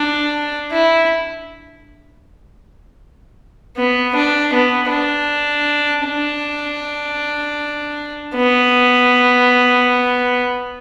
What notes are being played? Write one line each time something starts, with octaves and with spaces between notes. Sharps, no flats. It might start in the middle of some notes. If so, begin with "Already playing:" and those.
Already playing: D4
E4
B3
D4
B3
D4
D4
B3